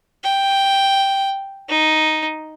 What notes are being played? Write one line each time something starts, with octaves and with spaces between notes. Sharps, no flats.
G5
D#4